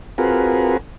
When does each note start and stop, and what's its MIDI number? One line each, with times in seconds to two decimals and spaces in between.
0.18 0.77 60
0.18 0.77 65
0.18 0.77 66
0.18 0.77 68
0.18 0.77 70
0.18 0.77 71